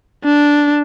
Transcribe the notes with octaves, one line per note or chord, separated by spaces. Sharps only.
D4